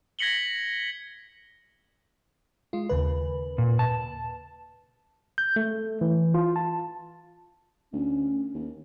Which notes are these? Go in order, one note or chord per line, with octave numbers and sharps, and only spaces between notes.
G#6 A#6 B6 C#7 F#7 G7
G#3 F4
D#2 C#3 B4
A#2
A5
G6
A3
E3
F4
A5
D2 C#4
D#2